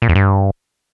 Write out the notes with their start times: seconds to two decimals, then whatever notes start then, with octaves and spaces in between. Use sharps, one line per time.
0.02 A#2
0.09 E2
0.15 G2